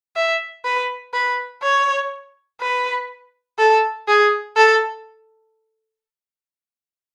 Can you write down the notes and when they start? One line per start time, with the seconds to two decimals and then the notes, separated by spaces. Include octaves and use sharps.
0.16 E5
0.65 B4
1.14 B4
1.62 C#5
2.61 B4
3.59 A4
4.08 G#4
4.57 A4